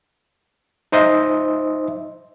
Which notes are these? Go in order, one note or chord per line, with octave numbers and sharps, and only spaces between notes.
D#4 C5 D#5 E5